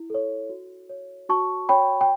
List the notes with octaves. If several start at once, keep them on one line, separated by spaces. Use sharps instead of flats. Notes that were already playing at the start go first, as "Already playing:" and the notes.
Already playing: E4
A4 C#5
F#4
C#5
F#4 A5 C#6
C#5 G5 B5
G5